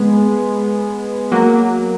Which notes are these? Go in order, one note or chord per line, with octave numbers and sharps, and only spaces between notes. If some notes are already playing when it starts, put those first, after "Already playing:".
Already playing: G#3 B3
F#3 A#3